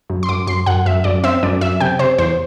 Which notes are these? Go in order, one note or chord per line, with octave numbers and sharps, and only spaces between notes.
F#2
C6
F#2 D6
F#2 C6
F#2 F#5
F#2 E5
F#2 D5
C4 E5
F#2 D5
F#2 E5
C3 G5
C3 C5
E2 C5